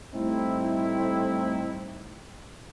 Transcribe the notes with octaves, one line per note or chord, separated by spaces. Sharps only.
A2 G3 A3 C4 D#4 E4